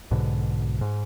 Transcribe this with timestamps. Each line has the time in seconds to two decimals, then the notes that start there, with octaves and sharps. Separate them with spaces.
0.11 B1 G#2 B2 D3
0.81 G#2